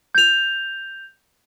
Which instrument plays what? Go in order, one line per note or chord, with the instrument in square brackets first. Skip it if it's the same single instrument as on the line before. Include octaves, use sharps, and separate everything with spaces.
[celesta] G6 F7